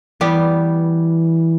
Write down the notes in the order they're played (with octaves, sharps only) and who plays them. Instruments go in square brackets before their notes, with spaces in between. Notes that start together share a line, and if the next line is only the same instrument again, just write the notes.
[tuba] E3 [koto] G3 B3 G4